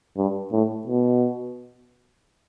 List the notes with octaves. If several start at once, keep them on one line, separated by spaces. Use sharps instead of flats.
G2
A2
B2